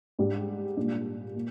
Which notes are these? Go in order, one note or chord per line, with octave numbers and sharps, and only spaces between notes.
G#2 G3 D4 G4
A#2 G3 D4
A#2